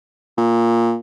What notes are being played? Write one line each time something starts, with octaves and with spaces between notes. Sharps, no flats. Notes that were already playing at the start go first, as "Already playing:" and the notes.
A#2